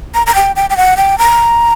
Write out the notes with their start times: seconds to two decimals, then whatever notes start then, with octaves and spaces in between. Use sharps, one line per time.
0.14 A#5
0.26 A#5
0.35 G5
0.56 G5
0.70 G5
0.77 F#5
0.97 G5
1.18 A#5